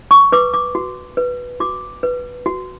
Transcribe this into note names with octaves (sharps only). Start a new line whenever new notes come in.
C#6
B4 D6
D6
F#4
B4
F#4 D6
B4
F#4